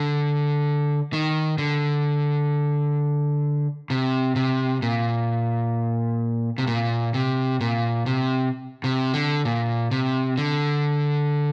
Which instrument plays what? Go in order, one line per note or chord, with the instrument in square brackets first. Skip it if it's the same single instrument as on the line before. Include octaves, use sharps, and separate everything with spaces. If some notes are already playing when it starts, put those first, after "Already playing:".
Already playing: [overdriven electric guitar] D3
D#3
D3
C3
C3
A#2
C3
A#2
C3
A#2
C3
C3
D3
A#2
C3
D3